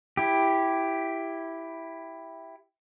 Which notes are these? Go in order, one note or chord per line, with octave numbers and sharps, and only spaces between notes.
E4 G4